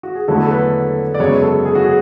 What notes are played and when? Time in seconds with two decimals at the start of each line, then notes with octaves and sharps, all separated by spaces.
0.03 F#4
0.15 G#4
0.28 E2 D3 F#3 A3 E4 A4
0.43 A4
0.51 B4
1.14 D5
1.19 F#2 C#3 G#3 B3 C#5
1.42 A4
1.65 G#4
1.75 F#4
1.84 G#4